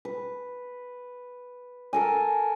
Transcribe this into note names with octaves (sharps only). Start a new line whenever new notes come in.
B4
A4 A#4 G#5